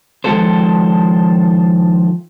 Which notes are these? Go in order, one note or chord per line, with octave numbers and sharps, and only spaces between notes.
D#3 F3 G#3 F4 A4 C5